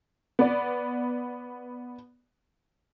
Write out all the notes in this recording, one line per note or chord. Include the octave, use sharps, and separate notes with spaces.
B3 D5